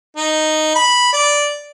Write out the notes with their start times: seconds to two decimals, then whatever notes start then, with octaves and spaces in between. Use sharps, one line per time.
0.17 D#4
0.75 B5
1.13 D5